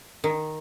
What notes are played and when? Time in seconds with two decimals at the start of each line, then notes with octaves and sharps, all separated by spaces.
0.24 D#3